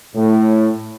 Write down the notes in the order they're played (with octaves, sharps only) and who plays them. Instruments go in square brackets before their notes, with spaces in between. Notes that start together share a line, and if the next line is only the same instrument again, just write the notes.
[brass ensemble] A2